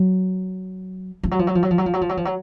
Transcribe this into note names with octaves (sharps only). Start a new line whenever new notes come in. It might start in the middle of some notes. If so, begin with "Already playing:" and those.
Already playing: F#3
F3
F#3
F3
F#3
F3
F#3
F3
F#3
F3
F#3
F3
F#3
F3
F#3